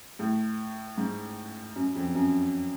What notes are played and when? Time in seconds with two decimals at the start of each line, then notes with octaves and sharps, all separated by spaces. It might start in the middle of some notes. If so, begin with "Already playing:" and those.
0.19 A2
0.98 G#2
1.76 F#2
1.95 F2
2.15 F#2